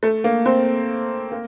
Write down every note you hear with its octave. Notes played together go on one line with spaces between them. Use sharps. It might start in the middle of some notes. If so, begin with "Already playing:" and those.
A3
A#3
C4
A#3